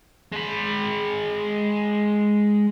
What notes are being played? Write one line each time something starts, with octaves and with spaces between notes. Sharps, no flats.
G#3 B5